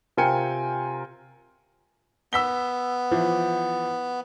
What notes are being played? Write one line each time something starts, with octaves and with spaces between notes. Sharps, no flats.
C3 F4 A#4 G5 G#5 C#7
B3 E6 B6 G7
E3 F3